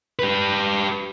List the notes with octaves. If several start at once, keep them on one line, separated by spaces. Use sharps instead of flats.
G4 B4